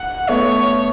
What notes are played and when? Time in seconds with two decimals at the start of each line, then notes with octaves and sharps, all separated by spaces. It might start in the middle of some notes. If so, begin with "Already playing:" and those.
Already playing: F#5
0.29 A3 B3 C#5